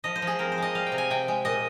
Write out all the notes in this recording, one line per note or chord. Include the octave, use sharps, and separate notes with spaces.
F3 D#5
C5
F3
G#4
C4 A#4
C5
G#3 D#5
G3 F5
G5
C3
G#5
C3 G5
G#3
A#2 D#5